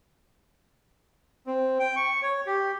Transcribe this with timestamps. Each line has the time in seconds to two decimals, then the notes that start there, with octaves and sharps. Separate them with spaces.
1.47 C4
1.80 G5
1.96 C#6
2.22 C#5
2.47 G4